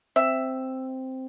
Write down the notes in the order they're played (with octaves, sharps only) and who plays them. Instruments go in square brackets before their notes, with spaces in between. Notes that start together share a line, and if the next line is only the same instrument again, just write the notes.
[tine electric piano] C4 [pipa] E5